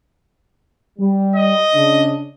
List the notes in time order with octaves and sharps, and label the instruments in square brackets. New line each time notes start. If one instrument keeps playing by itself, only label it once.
[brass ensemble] G3
[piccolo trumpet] D#5
[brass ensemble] C#3 D4